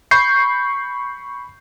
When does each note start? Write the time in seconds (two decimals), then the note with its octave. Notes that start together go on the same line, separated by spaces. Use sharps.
0.11 B5 C#6 G6 C7